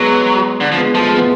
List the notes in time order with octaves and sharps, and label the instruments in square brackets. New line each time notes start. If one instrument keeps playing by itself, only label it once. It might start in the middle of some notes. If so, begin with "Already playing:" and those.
Already playing: [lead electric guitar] F#3 [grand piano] G#3 B3
[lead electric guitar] D3
F3
[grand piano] G#3 B3
[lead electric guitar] F3 [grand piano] A3
[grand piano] G#3
G#3 B3